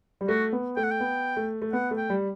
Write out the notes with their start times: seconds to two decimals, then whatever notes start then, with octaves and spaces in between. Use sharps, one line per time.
0.21 G3
0.28 A3 F#4
0.53 B3
0.76 A3 G5
0.84 F#5
0.91 G5
1.00 B3
1.36 A3
1.62 A3
1.73 B3 F#5
1.91 A3
1.97 G5
2.10 G3